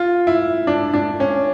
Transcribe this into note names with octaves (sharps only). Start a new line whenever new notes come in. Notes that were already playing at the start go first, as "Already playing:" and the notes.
Already playing: F4
E4
D4
D4
C#4